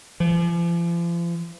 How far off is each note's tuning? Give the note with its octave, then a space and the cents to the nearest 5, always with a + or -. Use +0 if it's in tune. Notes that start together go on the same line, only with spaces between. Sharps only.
F3 -40